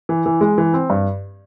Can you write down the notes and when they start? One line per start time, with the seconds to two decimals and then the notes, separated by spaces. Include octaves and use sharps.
0.09 E3
0.26 E3
0.41 G#3
0.58 E3
0.73 C4
0.90 G2